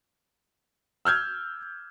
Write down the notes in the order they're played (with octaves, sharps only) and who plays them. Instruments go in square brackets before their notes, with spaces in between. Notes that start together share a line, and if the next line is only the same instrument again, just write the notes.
[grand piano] E6 F6 G6 G#6